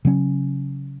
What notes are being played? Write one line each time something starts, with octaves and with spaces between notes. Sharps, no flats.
C#3 F#3 C#4